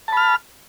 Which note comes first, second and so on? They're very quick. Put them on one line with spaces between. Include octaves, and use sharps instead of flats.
A5 B5 F6